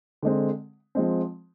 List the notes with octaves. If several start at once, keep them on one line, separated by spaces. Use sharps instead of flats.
D3 G#3 C4
F3 G#3 C4